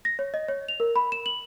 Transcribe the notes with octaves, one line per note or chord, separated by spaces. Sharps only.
A#6
C#5
D#5
C#5
F7
A#4
B5
E7
F#7